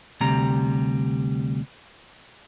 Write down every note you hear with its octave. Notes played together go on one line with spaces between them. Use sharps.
D2 C3 G3 A#5